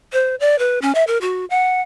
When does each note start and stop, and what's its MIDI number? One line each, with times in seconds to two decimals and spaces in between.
0.13 0.35 72
0.40 0.58 74
0.59 0.79 71
0.82 0.92 61
0.95 1.04 76
1.07 1.18 70
1.21 1.45 66
1.50 1.81 78